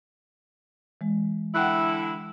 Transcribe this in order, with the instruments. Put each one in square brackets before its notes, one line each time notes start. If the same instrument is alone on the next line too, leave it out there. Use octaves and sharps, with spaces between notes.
[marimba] E3 G#3
[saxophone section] D3 E4 [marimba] F#5 G5 F#6